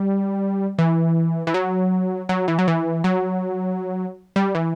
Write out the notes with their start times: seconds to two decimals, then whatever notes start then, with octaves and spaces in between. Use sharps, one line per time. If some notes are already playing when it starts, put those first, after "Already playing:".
Already playing: G3
0.78 E3
1.47 E3
1.54 F#3
2.29 F#3
2.48 E3
2.59 F#3
2.68 E3
3.04 F#3
4.36 G3
4.55 E3